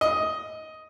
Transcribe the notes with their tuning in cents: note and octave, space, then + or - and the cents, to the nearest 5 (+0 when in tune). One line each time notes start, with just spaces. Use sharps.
D#5 +10